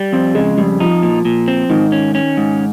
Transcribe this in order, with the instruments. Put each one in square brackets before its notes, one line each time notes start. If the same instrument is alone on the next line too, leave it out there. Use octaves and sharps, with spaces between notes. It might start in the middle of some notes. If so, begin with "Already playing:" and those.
Already playing: [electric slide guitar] G3
[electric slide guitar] F2 [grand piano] C4
[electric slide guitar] C#3 [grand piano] G#3
[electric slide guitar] F2 [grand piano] G3
[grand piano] F3 [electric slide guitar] D#4
[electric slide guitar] A#2
A#2
C4
[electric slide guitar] G#2 [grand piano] D#3
[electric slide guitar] C#4
C#4
G#2